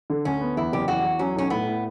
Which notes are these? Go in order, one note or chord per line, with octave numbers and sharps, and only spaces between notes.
D3
D2 C#4
B3
E2 E4
F#1 G4
E2 F#4
E2
F#3 C#4
B1 C#4
A2 B3
A2